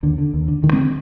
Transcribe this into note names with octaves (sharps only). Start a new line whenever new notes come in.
D#2 D3
D3
D#2
D3
D2 D#3
G#3 C4
D3